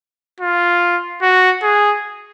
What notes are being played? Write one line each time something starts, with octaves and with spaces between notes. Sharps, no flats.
F4
F#4
G#4